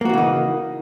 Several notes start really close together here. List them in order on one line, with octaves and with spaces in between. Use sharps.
A#3 F#4 E3 C#3 D#4